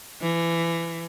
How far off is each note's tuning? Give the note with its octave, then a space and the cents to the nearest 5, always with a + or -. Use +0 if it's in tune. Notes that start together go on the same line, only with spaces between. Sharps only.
E3 +25